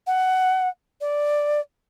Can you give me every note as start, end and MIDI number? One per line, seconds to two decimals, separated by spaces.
0.07 0.69 78
1.01 1.61 74